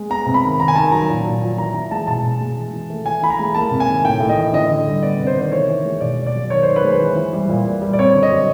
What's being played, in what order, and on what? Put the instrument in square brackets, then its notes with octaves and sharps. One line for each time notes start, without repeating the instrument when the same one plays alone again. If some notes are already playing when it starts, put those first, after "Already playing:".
Already playing: [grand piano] G#3
B3 A#5
C3
B5
D#3
D#3 A#5
G#5
D#3 A5
F#3 A#5
A#2
A#2
F3
E3 A#5
E3 A#5
G#3 A5
B2 A5
B2
G#3
E3
E3
A3
E3 G#5
E3 B5
A#5
G#3
A#3 A5
C3
G#5
D#3
A2 G5
A2
D#5
E3
D3 D#5
D3
G3
B3 D5
C3
C5
D#3
C5
E3 C#5
E3
G#3
B2 D5
B2
D5
F#3
D#3 C#5
D#3 C5
B4
G#3 C5
E3
E3
G3
A#2
A#2
G3
D5
C4 C#5
D3
D#5
F#3